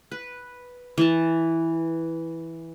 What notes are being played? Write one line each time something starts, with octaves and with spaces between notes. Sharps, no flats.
B4
E3 A5